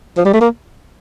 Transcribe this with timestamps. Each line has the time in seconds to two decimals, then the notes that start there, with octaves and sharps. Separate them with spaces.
0.17 F3
0.25 G3
0.33 A3
0.41 A#3